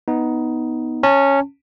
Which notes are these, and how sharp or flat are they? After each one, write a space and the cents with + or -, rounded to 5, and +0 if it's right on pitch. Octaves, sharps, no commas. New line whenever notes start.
B3 +0 D#4 +10
C#4 -5 A5 +25